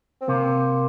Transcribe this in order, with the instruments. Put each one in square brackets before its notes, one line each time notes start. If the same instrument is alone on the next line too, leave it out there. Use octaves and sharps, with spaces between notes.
[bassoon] C4
[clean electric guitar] C3 [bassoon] A#3